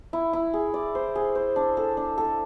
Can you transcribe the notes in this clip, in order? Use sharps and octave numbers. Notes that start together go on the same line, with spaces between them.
E4
E4
G#4
D5
C5
G#4
C5
D4
A4
D4
A4